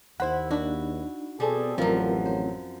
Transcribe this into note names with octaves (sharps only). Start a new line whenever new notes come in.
D#2 E4 C5 F#5 B5
D4 D#4 F#4 B5
B2 G3 C4 G#4 A4
A1 F#2 F3 F#3 C4 F4 A#4
C5